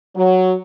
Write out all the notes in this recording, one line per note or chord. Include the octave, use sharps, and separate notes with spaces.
F#3